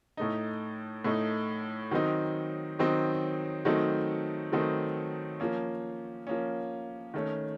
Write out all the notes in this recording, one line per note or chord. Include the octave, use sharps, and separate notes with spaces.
A2 A3 D#4
A2 A3 D#4
D#3 F#3 C4 D#4
D#3 F#3 C4 D#4
D#3 F#3 A3 C4 D#4
D#3 F#3 A3 C4 D#4
F3 A#3 C#4
F3 A#3 C#4
D#3 A3 C#4